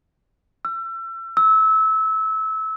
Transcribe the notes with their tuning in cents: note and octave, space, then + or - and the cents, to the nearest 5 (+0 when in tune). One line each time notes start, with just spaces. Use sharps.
E6 +35
E6 -25